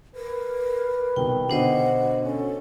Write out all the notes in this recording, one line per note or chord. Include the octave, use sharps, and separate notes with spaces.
A#4 B4
C2 B2 D#3 G5
B2 D3 D4 C5 D#5 F#5
C#4 A4